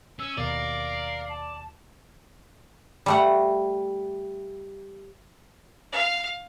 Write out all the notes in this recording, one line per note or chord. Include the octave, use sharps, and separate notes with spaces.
C#4 E6
D#2 B2 A#4 D5 F5
A5
G3 A3 F#5
F5